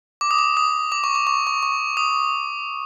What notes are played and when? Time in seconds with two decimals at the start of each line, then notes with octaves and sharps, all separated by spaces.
0.21 D6
0.31 D#6
0.39 D6
0.57 D#6
0.92 D6
1.04 C#6
1.15 D6
1.27 C#6
1.47 C#6
1.63 C#6
1.97 D#6